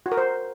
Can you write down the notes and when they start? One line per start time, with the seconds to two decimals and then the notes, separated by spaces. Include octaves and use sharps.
0.06 F#4
0.12 A#4
0.17 C5